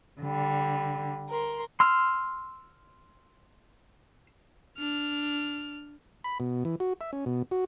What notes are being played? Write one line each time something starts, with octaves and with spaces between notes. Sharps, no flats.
D3 G3
A#4 C6
C6 E6 F6
D4 F6
B5
B2
E3
F#4
E5
C#4
B2
F#4